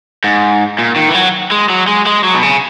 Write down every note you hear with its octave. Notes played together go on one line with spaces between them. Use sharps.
G#2
A#2
D#3
E3
F#3
G#3
F#3
G#3
G#3
F#3
B2
C#3